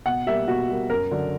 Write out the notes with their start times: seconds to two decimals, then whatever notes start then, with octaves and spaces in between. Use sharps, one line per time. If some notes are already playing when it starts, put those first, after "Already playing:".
0.06 B2 F#5
0.27 G3 A#3 E5
0.48 B2 F#4
0.69 G3 A#3
0.90 F#2 A#4
1.11 D3 F#3